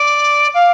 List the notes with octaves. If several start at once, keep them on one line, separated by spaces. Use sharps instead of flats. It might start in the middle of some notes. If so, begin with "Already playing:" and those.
Already playing: D5
F5